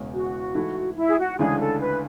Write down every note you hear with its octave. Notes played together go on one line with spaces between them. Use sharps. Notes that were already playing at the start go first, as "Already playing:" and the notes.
Already playing: E1 E2 C#3 G#3 C#4
F#4
G#2 E3 A3 E4 A4
E4
G#4
F#4
D2 C#3 E3 G#3 D4 G#4
A4
B4